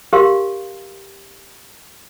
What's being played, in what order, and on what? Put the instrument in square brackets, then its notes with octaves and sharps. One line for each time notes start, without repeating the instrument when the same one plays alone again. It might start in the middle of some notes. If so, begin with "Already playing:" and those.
[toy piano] G4 A#4 F5 C6